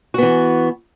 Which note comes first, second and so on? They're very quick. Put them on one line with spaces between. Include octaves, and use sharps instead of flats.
F#4 B3 E3